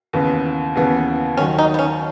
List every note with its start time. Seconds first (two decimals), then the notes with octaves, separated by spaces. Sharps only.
0.13 D#2 C#3 E3 B3
0.75 D#2 C#3 E3 B3
1.37 D#2 D#3 F#3 C#4
1.58 D#4
1.74 B3
1.79 C#4